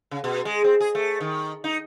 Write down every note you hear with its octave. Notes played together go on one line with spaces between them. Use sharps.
C#3
B2
G#3
C4
G#4
A3
D#3
D#4